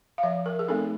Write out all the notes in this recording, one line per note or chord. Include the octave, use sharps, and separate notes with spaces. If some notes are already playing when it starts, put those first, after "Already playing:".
F5
F3 E5
A#4
G#4
A3 C4 D#4 A4